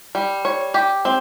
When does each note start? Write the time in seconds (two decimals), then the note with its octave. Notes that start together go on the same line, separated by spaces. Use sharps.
0.15 G3
0.45 C#5
0.74 G4
1.05 C4